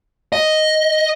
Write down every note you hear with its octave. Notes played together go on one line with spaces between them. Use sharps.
D#5